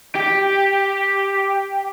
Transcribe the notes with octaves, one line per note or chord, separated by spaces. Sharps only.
G4